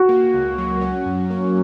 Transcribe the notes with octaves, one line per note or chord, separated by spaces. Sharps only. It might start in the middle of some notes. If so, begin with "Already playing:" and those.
Already playing: F#4
A#3
C#2
F#3
C#4
F#2
A#3